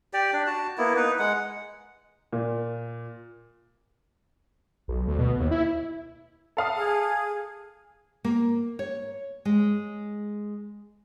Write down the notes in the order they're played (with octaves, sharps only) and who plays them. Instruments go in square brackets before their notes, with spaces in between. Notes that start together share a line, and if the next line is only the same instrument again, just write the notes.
[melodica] G4 D5
D4
F#4 A5
A#3 B3 E4
D#4 B4
G#3 F#5
[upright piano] A#2
[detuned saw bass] B1
D2
B2
D#2
E4
[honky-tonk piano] A4 F5 D#6
[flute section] G#4
[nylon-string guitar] A#3
C#5
G#3